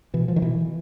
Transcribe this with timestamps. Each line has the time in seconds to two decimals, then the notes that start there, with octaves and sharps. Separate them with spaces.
0.14 B2 E3
0.28 F3
0.36 D#3
0.42 B2 E3